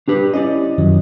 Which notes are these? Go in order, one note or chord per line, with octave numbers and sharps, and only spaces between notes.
D4 G4 B4
C#4 E4 D5 D#5
F#2 D#3 F#3